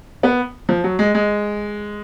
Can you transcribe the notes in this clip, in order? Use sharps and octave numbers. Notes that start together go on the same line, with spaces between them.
B3
F3
F#3
G#3
G#3